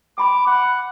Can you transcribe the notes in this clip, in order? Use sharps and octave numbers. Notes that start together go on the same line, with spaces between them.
G5 B5 C6 D6
F#5 B5